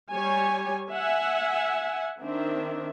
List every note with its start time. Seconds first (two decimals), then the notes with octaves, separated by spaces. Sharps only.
0.12 G3 C#5 G#5
0.92 E5 F#5 G#5
2.20 D#3 C4 D4 E5